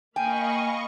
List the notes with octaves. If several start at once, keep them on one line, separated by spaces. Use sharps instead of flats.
A#3 D#5 F5 G5 G#5 B5 C#6